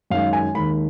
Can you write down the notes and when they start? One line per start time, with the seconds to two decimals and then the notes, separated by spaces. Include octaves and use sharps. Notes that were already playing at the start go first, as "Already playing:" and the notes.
0.10 F#2 D#3 G#3 F5
0.33 G#5
0.54 D#2 D#3 G#3 B5